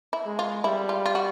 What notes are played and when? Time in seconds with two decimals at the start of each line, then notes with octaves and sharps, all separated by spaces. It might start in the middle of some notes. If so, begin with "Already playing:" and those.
0.13 E4
0.26 G#3
0.39 F4
0.64 G3 E4
0.89 F4
1.06 F4
1.15 F#4